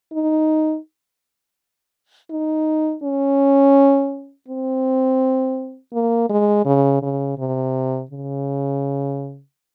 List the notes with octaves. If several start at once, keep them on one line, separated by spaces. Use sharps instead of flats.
D#4
D#4
C#4
C4
A#3
G#3
C#3
C#3
C3
C#3